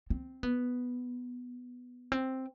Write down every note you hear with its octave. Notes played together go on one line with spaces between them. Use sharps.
C4
B3
C4